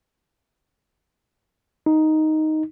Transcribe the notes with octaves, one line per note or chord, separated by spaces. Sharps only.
D#4